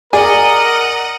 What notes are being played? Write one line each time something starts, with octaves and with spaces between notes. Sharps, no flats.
G#4 A#4 D5 D#5 F#5